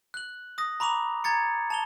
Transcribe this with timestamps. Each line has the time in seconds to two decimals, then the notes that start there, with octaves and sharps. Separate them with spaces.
0.14 F#6 F#7
0.58 D#6 A#6
0.80 A#5 B5 C#6 D6 F7
1.24 A#5 G#6 A6 C#7
1.70 A5 F7 G7